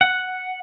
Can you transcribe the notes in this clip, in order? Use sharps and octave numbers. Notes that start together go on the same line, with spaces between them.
F#5